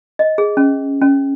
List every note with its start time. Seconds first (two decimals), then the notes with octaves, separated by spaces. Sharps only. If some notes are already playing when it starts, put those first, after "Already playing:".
0.19 D#5
0.38 G#4
0.57 C#4
1.02 C#4